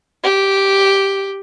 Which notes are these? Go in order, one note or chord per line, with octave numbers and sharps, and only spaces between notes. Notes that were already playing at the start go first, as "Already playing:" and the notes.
G4